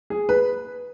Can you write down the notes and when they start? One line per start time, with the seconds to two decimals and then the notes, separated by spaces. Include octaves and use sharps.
0.10 G#4
0.29 B4